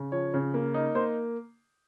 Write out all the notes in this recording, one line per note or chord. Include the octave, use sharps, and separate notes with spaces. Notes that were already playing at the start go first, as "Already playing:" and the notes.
Already playing: C#3
F3 C#5
C#3
A#3
D#4
A#3 C5